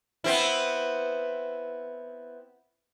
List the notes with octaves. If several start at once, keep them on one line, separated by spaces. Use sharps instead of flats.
B3 C4 E4